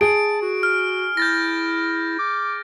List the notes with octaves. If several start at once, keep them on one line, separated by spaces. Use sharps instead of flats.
G#4 A5 D7
F#4
F6
E4 G6 A6 A#6
D6